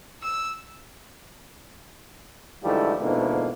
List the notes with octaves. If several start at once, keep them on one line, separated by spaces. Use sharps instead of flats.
E6
G#2 D3 E3 F3 G3 A3
G#2 B2 D3 E3 F3 A#3